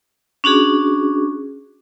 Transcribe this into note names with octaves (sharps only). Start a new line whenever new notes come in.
C#4 D4 F#4 G#4